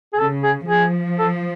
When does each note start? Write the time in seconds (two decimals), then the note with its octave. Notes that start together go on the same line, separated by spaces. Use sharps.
0.13 G#4
0.18 C#3 A4
0.43 G#4
0.68 F3 G#4
1.19 A4